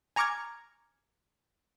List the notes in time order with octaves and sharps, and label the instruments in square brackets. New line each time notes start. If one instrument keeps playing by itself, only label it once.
[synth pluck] G#5 A#5 C#6 D6 F6 G#6